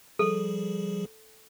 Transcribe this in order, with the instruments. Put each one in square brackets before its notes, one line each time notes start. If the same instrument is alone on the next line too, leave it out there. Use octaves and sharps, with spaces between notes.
[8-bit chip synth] F3 G3 G#4 [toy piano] A4